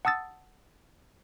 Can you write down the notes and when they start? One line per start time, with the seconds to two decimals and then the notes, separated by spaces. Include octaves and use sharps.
0.05 F#5 A5 D#6 E6 A6